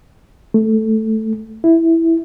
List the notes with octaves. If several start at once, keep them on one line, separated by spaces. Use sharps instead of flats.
A3
E4